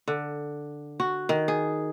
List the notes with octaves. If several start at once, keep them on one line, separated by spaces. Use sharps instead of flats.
D3
F#4
D#3
G#4